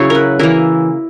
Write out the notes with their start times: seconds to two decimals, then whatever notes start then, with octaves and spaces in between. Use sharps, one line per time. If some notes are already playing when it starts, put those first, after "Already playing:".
Already playing: C#3 F#3 E4 C#5
0.10 A#4 B4
0.39 E3 A#3 E4 A#4